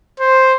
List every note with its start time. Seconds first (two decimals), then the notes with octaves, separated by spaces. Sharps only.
0.20 C5